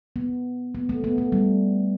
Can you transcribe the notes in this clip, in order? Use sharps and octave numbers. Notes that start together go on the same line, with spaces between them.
B3
B3
A3
B3
A3
G3